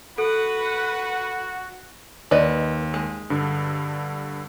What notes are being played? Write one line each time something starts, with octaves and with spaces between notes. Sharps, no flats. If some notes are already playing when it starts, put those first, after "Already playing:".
F#4 A4 B4 F#5
D#2 B4 D5 D#5
G#3
G2 D3